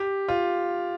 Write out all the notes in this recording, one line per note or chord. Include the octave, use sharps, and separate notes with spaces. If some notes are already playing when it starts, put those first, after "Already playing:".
Already playing: G4
F4